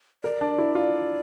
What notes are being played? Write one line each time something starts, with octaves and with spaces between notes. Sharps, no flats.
A#4 D5
D4
E4
F4